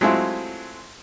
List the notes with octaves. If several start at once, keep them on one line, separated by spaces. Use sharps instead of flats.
F#3 G#3 A3 C4 E4 F4